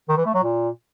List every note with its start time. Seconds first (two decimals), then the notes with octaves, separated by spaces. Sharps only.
0.09 D#3
0.17 E3
0.26 A3
0.34 F#3
0.43 A#2